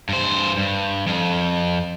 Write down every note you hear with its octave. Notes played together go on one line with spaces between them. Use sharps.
G2 C5
G2
F2